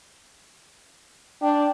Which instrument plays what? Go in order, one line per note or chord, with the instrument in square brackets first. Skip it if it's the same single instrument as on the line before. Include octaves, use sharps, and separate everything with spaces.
[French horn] D4 [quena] G5